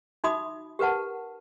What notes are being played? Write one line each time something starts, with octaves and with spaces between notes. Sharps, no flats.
D#4 F#4 E5 B5 D6 D#6
G4 A#4 B4 F#5 A5